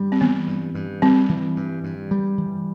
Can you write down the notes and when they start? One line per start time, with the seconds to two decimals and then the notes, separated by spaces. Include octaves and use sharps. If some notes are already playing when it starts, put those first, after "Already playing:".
Already playing: G2 G3
0.12 C4
0.21 E3 B3
0.47 G2
0.75 G2
1.02 G3 C4
1.29 E3
1.56 G2
1.84 G2
2.11 G3
2.38 E3